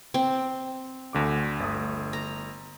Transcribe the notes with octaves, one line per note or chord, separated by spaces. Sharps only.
C4
D2 D3 D6
G1 A3 D#6
A#5